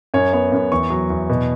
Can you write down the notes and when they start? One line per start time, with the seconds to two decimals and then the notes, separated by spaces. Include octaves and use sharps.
0.14 F#2 C#5
0.33 B3 C#5
0.52 F#2
0.72 E2 C#6
0.90 F#3
1.10 E2
1.30 B2